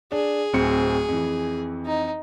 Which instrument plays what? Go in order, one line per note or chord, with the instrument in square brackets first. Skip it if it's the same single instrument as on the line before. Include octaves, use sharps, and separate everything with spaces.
[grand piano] D4 [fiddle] G#4
[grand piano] D1 C4 C#7
F2 E3
[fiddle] D#4